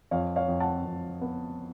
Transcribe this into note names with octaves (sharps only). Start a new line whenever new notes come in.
F2 C#5 F5
C#5 F5
F2
F#5 A5
F2
B3